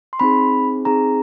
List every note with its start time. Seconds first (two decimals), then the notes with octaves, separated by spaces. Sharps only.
0.13 C6
0.19 C4 D#4 G#4 B5
0.85 C4 D#4 G#4 A#5